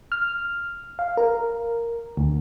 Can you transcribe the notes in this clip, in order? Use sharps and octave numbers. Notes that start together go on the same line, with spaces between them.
F6
F5
A#4
D2